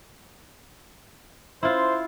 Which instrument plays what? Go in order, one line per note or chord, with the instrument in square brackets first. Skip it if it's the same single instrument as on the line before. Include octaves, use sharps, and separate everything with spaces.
[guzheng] E4 F4 [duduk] C5